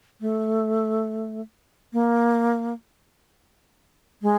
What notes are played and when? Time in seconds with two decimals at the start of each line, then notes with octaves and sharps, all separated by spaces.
0.21 A3
1.93 A#3
4.22 G#3